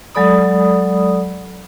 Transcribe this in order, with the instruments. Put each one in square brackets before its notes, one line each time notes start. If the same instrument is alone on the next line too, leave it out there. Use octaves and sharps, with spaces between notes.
[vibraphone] F#3 G#3 A4 D5 B5 D#6